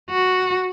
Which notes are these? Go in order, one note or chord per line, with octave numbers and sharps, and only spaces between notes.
F#4